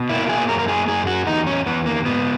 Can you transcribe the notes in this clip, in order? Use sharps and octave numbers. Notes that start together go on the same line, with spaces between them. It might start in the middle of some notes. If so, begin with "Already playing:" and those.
Already playing: B2
A#3 E4
G#4
F#2 A#4
A#4
G#4
F#2 G#4
F#4
E2 D#4
C#4
E2 B3
A#3
G#2 B3